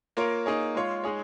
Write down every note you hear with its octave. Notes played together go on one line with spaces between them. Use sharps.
A#3 F4 A#4 C#5
A#3 D#4 G#4 C#5
G#3 F4 C#5
G#3 D#4 G#4 C#5